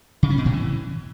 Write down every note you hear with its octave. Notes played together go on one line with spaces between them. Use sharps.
C#3
C#4
B2
A2
E3